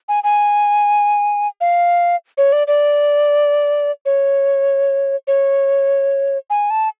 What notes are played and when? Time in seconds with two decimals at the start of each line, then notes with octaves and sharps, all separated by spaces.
0.08 G#5
0.24 G#5
1.61 F5
2.38 C#5
2.52 D5
2.67 D5
4.05 C#5
5.27 C#5
6.50 G#5
6.70 A5